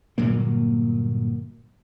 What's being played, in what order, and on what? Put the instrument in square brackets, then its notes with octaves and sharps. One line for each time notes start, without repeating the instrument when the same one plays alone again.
[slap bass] G1 A#2 F#3 A#3